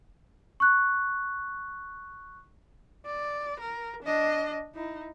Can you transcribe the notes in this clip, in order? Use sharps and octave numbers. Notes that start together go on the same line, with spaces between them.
C#6 F#6
D5
A#4
D4 D#5
D#4 E4